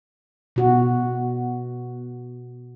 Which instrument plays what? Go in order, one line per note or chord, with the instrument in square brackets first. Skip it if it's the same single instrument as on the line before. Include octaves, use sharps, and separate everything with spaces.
[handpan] B2 F#4